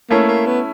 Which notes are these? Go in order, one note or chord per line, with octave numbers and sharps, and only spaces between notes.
A3 A#3 C#4 E4
A#3
B3